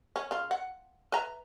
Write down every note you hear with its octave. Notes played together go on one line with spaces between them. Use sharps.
C#4
C#3 F4
F#5
B4 E5 A#5